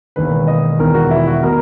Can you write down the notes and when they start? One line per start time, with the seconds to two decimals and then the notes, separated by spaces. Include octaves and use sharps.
0.16 E1 D#2 D#3 B4
0.47 D#5
0.79 E1 E2 D#3 A#4
0.94 F#4
1.11 E4
1.27 F#4
1.43 B2 A#4